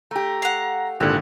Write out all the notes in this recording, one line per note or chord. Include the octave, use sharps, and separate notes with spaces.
A3 G4 A#5
F5 F#5
G#1 A#2 D3 E4 G4 F#6